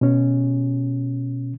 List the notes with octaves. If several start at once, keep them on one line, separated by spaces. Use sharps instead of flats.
B2 C#4